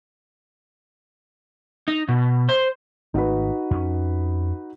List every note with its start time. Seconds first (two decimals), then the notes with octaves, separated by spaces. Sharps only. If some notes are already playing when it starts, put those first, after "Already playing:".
1.88 D#4
2.09 B2
2.49 C5
3.14 G#1 A3 D#4 F#4 B4
3.71 F2 C#4